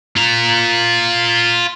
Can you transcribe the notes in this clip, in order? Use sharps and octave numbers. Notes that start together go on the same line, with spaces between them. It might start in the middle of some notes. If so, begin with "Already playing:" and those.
F4 A#5